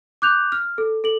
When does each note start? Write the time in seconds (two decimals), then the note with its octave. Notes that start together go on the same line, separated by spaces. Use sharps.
0.22 D6 F#6 G6 F7
0.52 F6
0.78 A4
1.04 A4 F#7